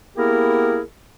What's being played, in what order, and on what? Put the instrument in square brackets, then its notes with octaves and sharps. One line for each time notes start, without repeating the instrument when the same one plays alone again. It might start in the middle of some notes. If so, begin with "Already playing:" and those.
[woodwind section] A#3 B3 E4 G4 G#4 A#4